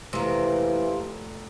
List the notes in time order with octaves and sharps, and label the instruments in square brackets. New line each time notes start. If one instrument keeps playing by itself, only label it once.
[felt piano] F1 [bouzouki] C3 A#3 [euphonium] E3